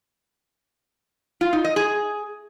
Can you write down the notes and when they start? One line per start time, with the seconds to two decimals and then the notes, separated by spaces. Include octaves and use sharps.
1.41 F4
1.53 D#4
1.64 D#5
1.76 G#4